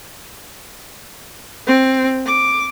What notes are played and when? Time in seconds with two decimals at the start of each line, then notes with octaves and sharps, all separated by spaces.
1.67 C4
2.26 D6